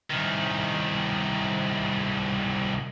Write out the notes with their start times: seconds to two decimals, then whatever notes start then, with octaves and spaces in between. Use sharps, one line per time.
0.10 C2 D#3